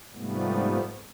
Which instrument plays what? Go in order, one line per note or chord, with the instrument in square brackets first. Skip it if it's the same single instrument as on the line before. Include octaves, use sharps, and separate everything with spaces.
[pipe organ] G#2 C3 F3 G3 A3 B3